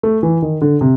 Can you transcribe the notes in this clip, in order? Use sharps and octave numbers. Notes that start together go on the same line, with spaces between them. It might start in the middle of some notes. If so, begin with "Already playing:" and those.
A3
E3
D#3
D3
C3